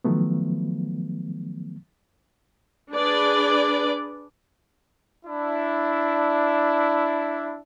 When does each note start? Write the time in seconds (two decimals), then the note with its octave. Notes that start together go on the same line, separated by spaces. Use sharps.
0.04 D#3 F3 F#3 A3 B3
2.93 D4 G#4 B4 D5
5.25 D4 E4